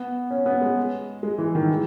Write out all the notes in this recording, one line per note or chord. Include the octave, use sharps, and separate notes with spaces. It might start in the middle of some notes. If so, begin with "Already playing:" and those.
Already playing: B3
C#4
B3
G#3
G#3
E3
D#3
E3